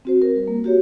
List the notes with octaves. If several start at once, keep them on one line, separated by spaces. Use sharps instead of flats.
C4 F#4 C5
A#4
G3
A#3
F#4 G4 C#5